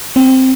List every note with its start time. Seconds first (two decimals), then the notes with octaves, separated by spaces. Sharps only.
0.16 C4